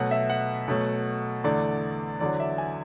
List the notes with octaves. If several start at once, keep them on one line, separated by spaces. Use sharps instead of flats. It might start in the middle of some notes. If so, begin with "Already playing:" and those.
Already playing: B2 F#3 A3 F#5
E5
F#5
B2 F#3 A3
E2 D3 A3 D5
E2 D3 F#3 D5
E5
G#5